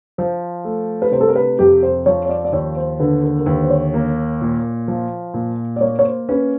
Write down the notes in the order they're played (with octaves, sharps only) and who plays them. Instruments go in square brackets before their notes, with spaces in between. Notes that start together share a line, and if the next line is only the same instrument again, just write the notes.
[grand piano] F3 [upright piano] C5
[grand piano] A3
[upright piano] B4
[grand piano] C3 [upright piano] C5
[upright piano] A4
A#4
B4
[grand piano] F2 [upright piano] G4
[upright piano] C5
[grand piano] F3 [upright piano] C#5
[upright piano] C#5
D5
D5
[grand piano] D#2 [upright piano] C#5
[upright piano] C5
[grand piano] D3 [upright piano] B4
[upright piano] A#4
A#4
[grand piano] D#2 [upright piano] B4
[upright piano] C5
C#5
[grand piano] A#3
A#2
F3
A#2
[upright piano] D5
[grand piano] A#3 [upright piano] C#5
[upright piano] C#5
C5
[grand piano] C#4 [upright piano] B4